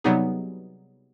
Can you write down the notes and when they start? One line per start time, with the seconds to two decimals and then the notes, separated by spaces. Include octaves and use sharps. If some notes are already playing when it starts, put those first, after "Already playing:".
0.04 C3 F#3 G3 B3 D#4 G#4